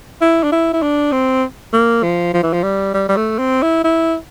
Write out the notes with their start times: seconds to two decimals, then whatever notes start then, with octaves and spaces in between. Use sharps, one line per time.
0.21 E4
0.44 D4
0.52 E4
0.73 E4
0.82 D4
1.12 C4
1.73 A#3
2.03 F3
2.34 F3
2.43 E3
2.53 F3
2.63 G3
2.94 G3
3.09 G3
3.17 A3
3.39 C4
3.62 E4
3.84 E4